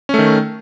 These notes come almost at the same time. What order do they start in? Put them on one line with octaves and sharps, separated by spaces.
C#4 A3 D#3